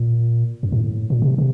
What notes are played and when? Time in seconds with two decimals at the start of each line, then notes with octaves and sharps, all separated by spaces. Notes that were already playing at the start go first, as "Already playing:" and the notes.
Already playing: A#2
0.63 F#2
0.72 A2
1.10 A#2
1.22 C3
1.38 C3